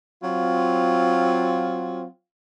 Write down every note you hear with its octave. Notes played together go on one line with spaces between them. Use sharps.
F#3 C4 F4